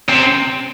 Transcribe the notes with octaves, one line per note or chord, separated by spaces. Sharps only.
C3